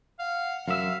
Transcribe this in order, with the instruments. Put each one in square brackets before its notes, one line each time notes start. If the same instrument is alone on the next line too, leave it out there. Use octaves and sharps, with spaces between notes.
[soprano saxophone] F5 [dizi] F#5
[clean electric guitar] F#2 E5 [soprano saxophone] F5